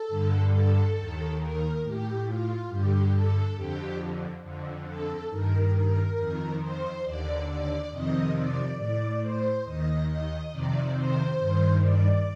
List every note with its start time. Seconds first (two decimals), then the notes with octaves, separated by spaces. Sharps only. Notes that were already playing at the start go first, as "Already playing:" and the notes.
Already playing: A4
0.09 G2 D3
0.52 A4
0.96 D#2 D#3
1.40 A#4
1.83 A2 G4
2.26 F4
2.69 G2 D3 G4
3.13 A4
3.56 F2 D3 G4
4.43 F2 D3
4.87 A4
5.30 G2 D#3 A#4
5.74 A#4
6.17 F2 D#3
6.61 C5
7.04 D#2 D3 D5
7.47 D5
7.90 F2 C3 D#3 D#5
8.34 D5
8.77 A2 D5
9.22 C5
9.64 D#2 D#3 D#5
10.08 D#5
10.51 F2 C3 D#3 D5
10.95 C5
11.38 G2 D#3
11.81 D5